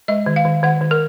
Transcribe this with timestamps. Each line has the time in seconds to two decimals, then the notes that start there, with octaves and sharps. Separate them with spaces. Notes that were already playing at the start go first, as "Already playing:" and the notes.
0.08 G#3 D#5
0.26 D#3
0.36 F5
0.45 D#3
0.63 D#3 F#5
0.81 D#3
0.91 A#4